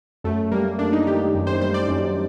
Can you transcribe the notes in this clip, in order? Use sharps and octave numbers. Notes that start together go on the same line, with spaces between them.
F#2 A3
G3 A#3
F#2 D4
D#4
D#3 G4
F#2
C5
G3 C5
D5
F#2